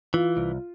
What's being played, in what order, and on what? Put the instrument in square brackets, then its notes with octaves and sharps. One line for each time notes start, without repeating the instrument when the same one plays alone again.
[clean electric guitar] E3 [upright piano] F4
[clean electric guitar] C2